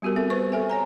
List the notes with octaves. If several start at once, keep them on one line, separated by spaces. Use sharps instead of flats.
G3 B3 F#4 G4 A#4
C4 A4 E5
B3 B4 C5 C#6
A4 E5 G#5
C#5 G#5 A#5